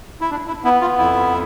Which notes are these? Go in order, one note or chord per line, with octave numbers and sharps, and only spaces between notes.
E4
D4
E4
B3 E4
F4
F2 E4